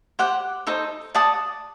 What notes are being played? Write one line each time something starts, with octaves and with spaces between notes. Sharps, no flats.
G4 C5 F#5
D#4 A4 C5
D5 F#5 A5 D#6